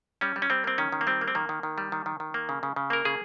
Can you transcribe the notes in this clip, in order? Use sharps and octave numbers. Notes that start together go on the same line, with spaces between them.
G3 C#4
G3
C#4
G3 C4
A#3 C4
D#3 C#4
D#3
A#3
G3 C4
A#3
C4
D#3 A#3
D#3
D#3
G3
D#3
D#3
D#3
A#3
C#3
C#3
C#3
A#3 A#4
C#3 G#4